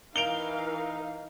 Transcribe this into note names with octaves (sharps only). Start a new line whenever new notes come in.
E3 D#4 A#4 F5 D7 F7 G7